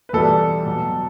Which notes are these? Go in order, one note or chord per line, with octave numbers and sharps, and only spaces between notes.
B4
E2 B2 G3 A4
B2 F#3